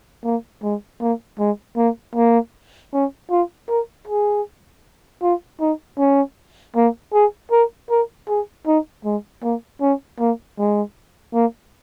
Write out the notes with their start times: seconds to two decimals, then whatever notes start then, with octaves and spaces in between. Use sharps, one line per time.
0.24 A#3
0.63 G#3
1.01 A#3
1.39 G#3
1.77 A#3
2.16 A#3
2.93 C#4
3.30 F4
3.69 A#4
4.07 G#4
5.22 F4
5.60 D#4
5.98 C#4
6.76 A#3
7.14 G#4
7.52 A#4
7.90 A#4
8.29 G#4
8.67 D#4
9.05 G#3
9.43 A#3
9.81 C#4
10.20 A#3
10.59 G#3
11.34 A#3